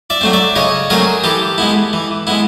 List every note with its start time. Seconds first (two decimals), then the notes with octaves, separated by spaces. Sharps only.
0.10 D5 E5
0.21 F#3 A3 C4
0.33 D5 E5
0.56 C#3 C#5 D#5
0.90 F#3 A3 C4 G#4 A#4
1.24 E3 G4 A4
1.58 G#3 B3 E4
1.93 E3
2.27 G#3 B3 E4